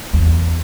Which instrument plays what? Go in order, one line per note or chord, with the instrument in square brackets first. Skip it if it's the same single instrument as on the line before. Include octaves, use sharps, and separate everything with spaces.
[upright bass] E2